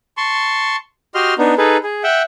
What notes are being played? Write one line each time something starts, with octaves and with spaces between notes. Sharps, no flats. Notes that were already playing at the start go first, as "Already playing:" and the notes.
A5 C6 C#6
F#4 G4 D#5 C6 F6
B3 D4 D#4
D#4 G#4 A4 B4
G#4
E5 F#5 G5